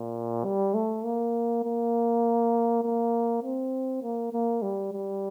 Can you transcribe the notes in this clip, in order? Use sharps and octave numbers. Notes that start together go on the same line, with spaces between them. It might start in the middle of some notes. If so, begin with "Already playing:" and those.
Already playing: A#2
G3
A3
A#3
A#3
A#3
C4
A#3
A#3
G3
G3